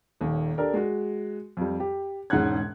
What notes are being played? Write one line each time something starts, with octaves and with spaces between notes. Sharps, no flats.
D#1 D#2
D4 G4 A4 A#4 D5
G#3 F#4
F2 G3
G4
E1 G#2 C#4 F#5 F#6 G#6